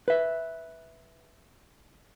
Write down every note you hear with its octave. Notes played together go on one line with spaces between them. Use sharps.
B4 E5